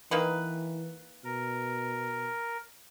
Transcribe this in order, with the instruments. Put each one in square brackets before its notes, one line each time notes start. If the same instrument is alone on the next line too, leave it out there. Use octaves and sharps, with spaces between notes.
[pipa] D#3 A#3 B4 [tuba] E3
[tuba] B2 [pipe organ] A#4